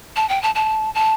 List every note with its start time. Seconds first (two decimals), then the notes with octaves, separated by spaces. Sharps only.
0.16 A5
0.29 G5
0.43 A5
0.55 A5
0.95 A5